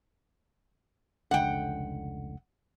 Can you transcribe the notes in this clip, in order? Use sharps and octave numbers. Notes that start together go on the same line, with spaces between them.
F1 C#2 D3 F#5 G5